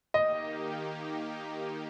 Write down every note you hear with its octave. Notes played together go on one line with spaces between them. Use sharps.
D#3 A#3 D#4 G4 D#5